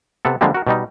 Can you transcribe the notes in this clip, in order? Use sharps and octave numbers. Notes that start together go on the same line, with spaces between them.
C3 B3 A4
D3 F3 G3 G#3 A#3 C4
F#4 A#4
B2 G3 D#4